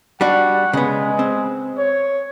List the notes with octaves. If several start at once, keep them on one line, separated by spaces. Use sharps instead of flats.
G3 D4 F#4 F#5
C#3 G#3 B3
C4
C#5